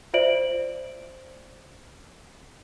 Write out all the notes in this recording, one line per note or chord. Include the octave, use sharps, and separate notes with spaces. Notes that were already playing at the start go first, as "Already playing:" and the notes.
F4 C5 D5 E5 D7 F#7